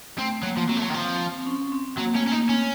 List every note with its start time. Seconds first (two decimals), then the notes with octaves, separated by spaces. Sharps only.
0.18 A3 C4
0.43 F#3 A#3
0.57 F3
0.69 F#3 C4
0.77 A3
0.82 F#3
0.90 D#3
0.95 F3
1.38 C4
1.46 C#4
1.72 C4
1.97 F#3 A#3
2.14 A3 C#4
2.24 A#3 C#4
2.32 D#4
2.49 C4 C#4